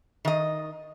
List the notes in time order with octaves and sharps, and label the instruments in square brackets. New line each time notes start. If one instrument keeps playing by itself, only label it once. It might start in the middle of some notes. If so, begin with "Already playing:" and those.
[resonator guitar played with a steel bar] D#3 D#5